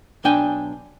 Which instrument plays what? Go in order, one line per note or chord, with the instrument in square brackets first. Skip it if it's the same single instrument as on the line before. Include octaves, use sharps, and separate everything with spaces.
[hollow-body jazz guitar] B1 B2 D4 G5 G#5